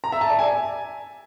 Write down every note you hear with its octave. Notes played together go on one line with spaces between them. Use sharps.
A#5
E5
A5
D5
G#5